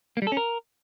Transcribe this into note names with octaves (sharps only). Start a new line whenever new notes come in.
A#3
G3
A4
C#4
A#4